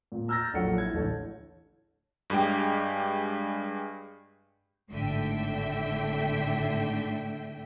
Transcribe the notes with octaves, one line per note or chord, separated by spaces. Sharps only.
A#2
A#5 E6 F6 G6 A6 A#6
A#1 F#3 A4 C#5 F#5 C#7
E4 G#6
A1 D2 A4 C#5
G2 G#3 G4 G5
G#1 A2 D3 E5 G5